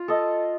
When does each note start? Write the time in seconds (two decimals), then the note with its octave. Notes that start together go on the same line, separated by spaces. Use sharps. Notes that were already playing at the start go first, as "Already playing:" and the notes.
Already playing: F4
0.08 A4 D#5